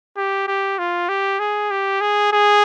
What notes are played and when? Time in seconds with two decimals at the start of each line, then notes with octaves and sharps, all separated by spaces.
0.17 G4
0.47 G4
0.79 F4
1.09 G4
1.39 G#4
1.71 G4
2.01 G#4
2.33 G#4